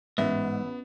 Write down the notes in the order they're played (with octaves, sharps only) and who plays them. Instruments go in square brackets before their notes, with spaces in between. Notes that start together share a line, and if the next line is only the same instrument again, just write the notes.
[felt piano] A1 E5 [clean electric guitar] G#2 [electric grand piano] B3